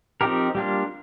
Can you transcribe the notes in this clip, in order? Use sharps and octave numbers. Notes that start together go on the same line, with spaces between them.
F3 C4 D#4 G4 A#4
G3 A#3 D4 F4